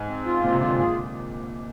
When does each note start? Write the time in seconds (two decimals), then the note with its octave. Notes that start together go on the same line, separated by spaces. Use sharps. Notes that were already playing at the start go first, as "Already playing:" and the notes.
Already playing: G#2
0.08 C4
0.26 F4
0.43 A#2 C4
0.52 C3
0.60 D3 F4
0.70 C3
0.78 A#2 G#4